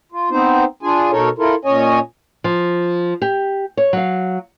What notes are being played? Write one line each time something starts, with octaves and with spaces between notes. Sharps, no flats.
F4
B3 C4 D#4 C5
D4 F4 G#4 G#5
B2 D#4 A4 A#4 C#5
E4 F4 A4 A#4
A#2 C#4 C#5 D#5 G#5
F3
G4
C#5
F#3 F5